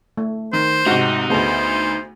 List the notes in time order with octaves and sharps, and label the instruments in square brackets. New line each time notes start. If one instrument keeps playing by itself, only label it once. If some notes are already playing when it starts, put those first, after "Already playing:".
[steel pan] A3
[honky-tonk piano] D#3 [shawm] C5
[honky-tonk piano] G#2 C3 [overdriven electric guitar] D#4 [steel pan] F#4
[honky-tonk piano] D2 B3 [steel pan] A3 G#4 A5 [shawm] C5